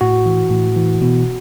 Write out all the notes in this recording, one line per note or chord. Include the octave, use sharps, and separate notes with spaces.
A2 F#4
E3
A2
E3
B2